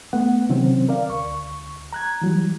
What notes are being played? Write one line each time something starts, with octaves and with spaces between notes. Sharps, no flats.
A3 B3 F#5
C3 D#3 F#3 C4 C#4
A#4 D5 F5
D2 C#6
A#5 F#6 G#6
E3 F#3 G3